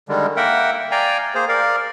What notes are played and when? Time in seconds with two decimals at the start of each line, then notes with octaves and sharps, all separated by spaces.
0.09 D3 D#3 G3 G#3
0.37 A#3 A#4 E5 F#5 G5
0.91 D5 F5 G5 G#5 A#5
1.35 A#3 G#4 C5
1.48 A#4 D5 F5